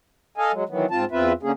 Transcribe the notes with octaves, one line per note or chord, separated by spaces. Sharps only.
A4 D#5 F5 G#5
F#3 G#3
D#3 E3 F#3 B3
G#2 C4 F4 A5
E2 C4 F4 B4 E5
D3 A#3 C#4 G#4